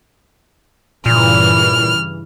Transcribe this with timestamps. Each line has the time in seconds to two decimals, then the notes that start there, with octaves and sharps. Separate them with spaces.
1.06 G2 A#2 C#3 E3 F6